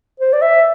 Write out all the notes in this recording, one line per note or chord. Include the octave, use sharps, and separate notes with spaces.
C5
D5
E5